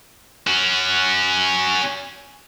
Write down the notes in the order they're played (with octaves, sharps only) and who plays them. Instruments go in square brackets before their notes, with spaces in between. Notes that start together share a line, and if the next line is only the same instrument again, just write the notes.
[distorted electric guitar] C#4 F#4